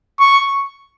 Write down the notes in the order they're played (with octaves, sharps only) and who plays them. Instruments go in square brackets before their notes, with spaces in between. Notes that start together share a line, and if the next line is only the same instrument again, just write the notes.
[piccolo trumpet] C#6